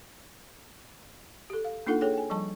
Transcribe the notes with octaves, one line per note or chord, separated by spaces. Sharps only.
G4 A4
F5
A#3 D4 D#4 F4 A4 F#5
G#4 A4 C#5 G5
G5 G#5
F3 G3 D#5 A5 C#6